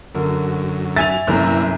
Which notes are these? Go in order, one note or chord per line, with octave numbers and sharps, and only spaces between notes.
F#2 D3 A#4
E5 G#5 A6 F7
G1 C2 F#2 A#3 E4 A#5